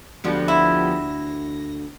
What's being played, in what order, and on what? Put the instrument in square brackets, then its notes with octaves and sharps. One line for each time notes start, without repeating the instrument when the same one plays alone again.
[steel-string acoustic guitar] D2 D4 F#4 [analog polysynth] F3 B3 G4
[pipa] E4
[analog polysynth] A#6